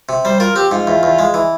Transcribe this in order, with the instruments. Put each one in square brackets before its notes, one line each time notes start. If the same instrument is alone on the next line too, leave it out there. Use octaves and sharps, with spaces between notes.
[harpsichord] C3
[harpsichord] G3 [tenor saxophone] C5
[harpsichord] F4 [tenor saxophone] A#4
[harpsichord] C4 [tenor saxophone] G4
[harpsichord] G#2 [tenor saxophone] F4
[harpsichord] E2
E2
G#3
E3